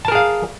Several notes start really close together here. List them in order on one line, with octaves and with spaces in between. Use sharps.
A5 A#4 G#4 F5